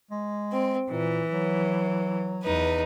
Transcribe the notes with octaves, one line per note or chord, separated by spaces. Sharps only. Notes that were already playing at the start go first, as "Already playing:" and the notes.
G#3
C4
A#2 E3
F#3
E2 D#4 B4